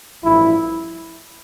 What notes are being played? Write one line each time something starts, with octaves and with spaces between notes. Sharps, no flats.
A1 G2 F3 E4